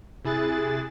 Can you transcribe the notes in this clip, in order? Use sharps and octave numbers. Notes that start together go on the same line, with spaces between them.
C3 E4 G#4 F#6 A6